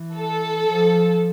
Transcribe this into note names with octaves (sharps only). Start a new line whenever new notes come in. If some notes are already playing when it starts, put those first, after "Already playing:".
Already playing: E3
A4
F3